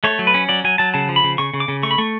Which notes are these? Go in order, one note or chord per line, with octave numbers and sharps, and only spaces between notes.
A3 C#5
F#3
B4
C#4
F#3 D5
F#3 G#5
F#3 A5
C#3 A5
F3
B5
C#3
C#3 C#6
C#3
D6
C#3
A3 C#6
B5
A3 C#6